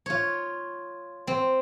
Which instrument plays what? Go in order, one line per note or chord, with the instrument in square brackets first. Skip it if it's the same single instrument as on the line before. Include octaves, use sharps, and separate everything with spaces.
[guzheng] F4 C#5
C4